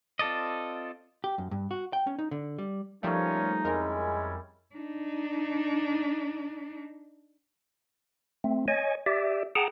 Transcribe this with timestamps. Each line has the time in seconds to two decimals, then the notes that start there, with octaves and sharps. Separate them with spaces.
0.19 C4 F4 A4 D5 D#5
1.24 G4
1.38 F#2
1.51 G2
1.71 F#4
1.93 G5
2.07 C#4
2.19 D#4
2.31 D3
2.58 G3
3.03 F3 G3 A3 A#3 C#4 D#4 F4 C#5
3.65 F2 G3 G#3 C#4 E4 A#4
4.75 D4 D#4
8.44 A3 C4
8.68 C#5 D#5 G#5
9.06 G4 D5 E5
9.55 G#4 F#5 G5 A5 A#5